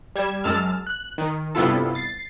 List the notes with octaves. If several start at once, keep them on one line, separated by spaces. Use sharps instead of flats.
G3 G#6 E7
F#2 G#3 A5 E6 F6
F#6
D#3
G2 C3 B3 E4 F4 A4
A6 C7